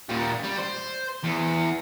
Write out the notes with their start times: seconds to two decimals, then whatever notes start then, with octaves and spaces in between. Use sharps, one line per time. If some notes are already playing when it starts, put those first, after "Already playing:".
0.09 A#2 G3
0.44 G3
0.58 C5
1.23 E2